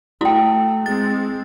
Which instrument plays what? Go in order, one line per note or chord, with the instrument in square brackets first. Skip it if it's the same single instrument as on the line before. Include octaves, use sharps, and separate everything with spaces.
[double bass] A3 [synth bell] E4 [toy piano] F#4 G5
[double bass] G#3 C4 [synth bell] A6